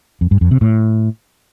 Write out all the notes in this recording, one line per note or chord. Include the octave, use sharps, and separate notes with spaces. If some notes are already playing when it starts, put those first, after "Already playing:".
F2
G2
F2
C3
A2